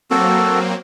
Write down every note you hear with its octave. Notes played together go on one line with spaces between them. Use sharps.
F#3 A#3 C4 F#4 A4